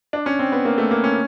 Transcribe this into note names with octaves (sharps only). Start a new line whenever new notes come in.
D4
C#4
C4
B3
A#3
A3
A#3
C#4